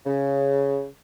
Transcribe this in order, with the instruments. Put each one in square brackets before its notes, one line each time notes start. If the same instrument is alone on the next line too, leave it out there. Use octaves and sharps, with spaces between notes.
[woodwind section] C#3